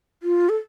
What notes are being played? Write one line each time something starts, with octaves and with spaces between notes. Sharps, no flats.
F4
A4